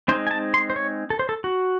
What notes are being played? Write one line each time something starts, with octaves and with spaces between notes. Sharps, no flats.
G#3 C4 D#4 C5
G#5
A5
C6
C5
C#5
A4
C5
A4
F#4